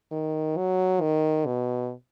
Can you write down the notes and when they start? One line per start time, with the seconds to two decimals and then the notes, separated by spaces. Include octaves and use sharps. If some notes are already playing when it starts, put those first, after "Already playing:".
0.12 D#3
0.57 F#3
1.01 D#3
1.46 B2